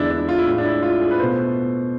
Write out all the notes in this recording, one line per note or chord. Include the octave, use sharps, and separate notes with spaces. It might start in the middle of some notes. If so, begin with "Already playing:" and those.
Already playing: E2 D3 G#3 D4 E4
D4
E4
F4
E4
A2 G#3
D4
E4
F4
G#4
B4
B2 A3 C5